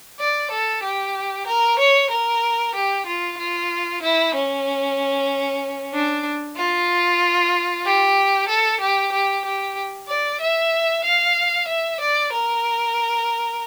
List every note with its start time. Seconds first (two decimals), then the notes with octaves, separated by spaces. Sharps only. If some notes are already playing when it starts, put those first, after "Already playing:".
0.20 D5
0.51 A4
0.83 G4
1.46 A#4
1.79 C#5
2.10 A#4
2.75 G4
3.06 F4
3.38 F4
4.02 E4
4.34 C#4
5.94 D4
6.57 F4
7.85 G4
8.48 A4
8.80 G4
9.12 G4
9.45 G4
10.08 D5
10.41 E5
11.04 F5
11.68 E5
12.00 D5
12.32 A#4